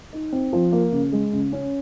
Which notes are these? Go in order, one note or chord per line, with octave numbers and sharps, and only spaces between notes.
D#4
C4
F3
A#3
C#3
G#3
C#3
C#4